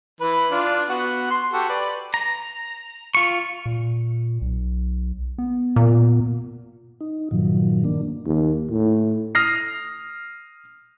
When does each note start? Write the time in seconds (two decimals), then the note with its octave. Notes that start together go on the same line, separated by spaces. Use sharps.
0.21 E3 B4
0.51 D4 F4
0.89 B3 F#4
1.31 C6
1.53 F#4 G4 A4
1.69 B4 D5
2.14 A#5
3.15 F4 C#6
3.66 A#2
4.42 B1
5.38 B3
5.76 A#2
7.00 D#4
7.31 G2 A#2 D#3 F3 F#3
7.84 D#3 A#3 D4
8.26 D#2
8.71 A2
9.35 D#6 F6 A#6 C7